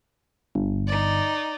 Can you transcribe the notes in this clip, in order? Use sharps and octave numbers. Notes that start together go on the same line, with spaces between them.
G1
D#4 D5